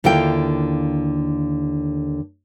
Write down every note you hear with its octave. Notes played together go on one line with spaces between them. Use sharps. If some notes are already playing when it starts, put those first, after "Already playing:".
D#2 D3 E4 F4 G5